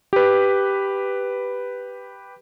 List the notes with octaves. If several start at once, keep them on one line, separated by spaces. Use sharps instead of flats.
G4 B4